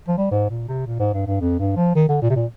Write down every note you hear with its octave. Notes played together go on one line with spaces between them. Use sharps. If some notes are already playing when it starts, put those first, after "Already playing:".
F3
G3
G#2
A#2
C3
A#2
G#2
G2
G2
F2
G2
F3
D#3
D3
A#2
C3
A#2